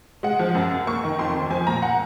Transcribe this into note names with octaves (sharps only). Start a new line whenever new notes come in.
G#3 F#5
F3
F#2
F#2
A#3 C#6
D#3
F2 C6
F2
F3 G#5
A#2 A#5
F#5